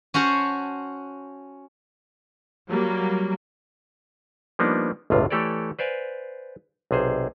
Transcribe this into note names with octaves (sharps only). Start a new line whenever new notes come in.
C#4 F#4 C5 F#5 A5
F#3 G3 A#3
F3 G3 A#3 B3 D4 D#4
G1 C#2 A2 C3 F4
E3 A3 G4 A4 C#5 D5
B4 C5 D5 F5 G#5
B1 C3 G#4 C5